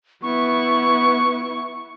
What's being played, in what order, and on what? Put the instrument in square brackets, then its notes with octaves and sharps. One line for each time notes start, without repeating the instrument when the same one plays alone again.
[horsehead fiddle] B3 E4 [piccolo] C#6